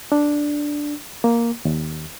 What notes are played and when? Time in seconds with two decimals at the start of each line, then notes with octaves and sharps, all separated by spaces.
0.12 D4
1.24 A#3
1.65 D#2